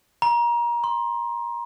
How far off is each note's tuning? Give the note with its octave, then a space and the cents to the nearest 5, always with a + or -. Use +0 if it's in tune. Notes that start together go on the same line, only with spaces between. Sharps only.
A#5 +30
C6 +15